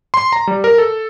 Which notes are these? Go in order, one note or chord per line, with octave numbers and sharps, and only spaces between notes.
C6
A#5
G3
A#4
A4